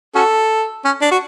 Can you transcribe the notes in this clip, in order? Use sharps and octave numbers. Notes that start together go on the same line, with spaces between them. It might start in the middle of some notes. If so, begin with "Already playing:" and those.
C#4 F#4 A4
C#4
D4
F#4